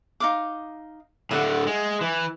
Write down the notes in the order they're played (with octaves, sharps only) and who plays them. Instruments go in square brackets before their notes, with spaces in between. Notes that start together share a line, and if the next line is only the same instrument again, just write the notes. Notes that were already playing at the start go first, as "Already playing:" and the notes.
[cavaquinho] D#4 F5 D6
[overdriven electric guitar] A2 D3 [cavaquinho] E5 F#5
[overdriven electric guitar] G#3
E3